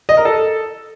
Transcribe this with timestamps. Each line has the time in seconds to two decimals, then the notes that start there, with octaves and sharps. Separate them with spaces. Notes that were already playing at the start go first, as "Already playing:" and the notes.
0.09 D#5
0.17 A#4
0.25 A4